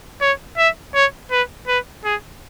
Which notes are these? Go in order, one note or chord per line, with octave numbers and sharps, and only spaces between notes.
C#5
E5
C#5
B4
B4
G#4